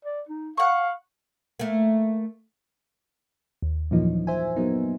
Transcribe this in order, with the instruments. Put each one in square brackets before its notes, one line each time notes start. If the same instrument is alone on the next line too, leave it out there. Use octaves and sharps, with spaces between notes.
[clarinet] D5
D#4
[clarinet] F5 [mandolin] F#5 C#6
[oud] A3 A#3
[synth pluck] D#2
F#2 A#2 E3 F3 A#3 D#4
C5 E5 G#5
F#3 A#3 B3 D#4